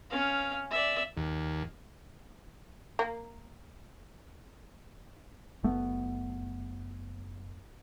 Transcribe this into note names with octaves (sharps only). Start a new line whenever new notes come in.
C#4 F5
D5 E5
D#2
A#3
F#1 A3 B3